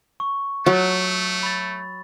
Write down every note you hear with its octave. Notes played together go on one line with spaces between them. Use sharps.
C#6
F#3 A3
B5 A6